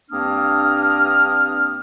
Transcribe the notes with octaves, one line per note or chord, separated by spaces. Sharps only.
G2 A#3 C4 D4 D#6 F6